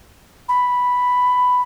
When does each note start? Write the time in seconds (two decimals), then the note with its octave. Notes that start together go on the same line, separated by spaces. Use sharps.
0.49 B5